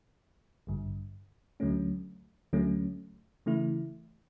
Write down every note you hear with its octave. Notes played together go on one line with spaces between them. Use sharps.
A1 G2 D3
D2 D3 F#3 A3 C#4
D2 D3 F#3 A3 C#4
C#3 E3 A3 E4